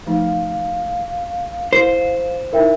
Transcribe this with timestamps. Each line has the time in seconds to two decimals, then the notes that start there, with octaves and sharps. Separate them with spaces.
0.06 F3 A3 D#4 F5
1.73 E4 C5
2.53 D#4 E4 A#4 E5 G5